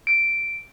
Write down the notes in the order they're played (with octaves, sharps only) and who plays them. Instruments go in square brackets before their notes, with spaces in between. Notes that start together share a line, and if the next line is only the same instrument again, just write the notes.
[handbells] D7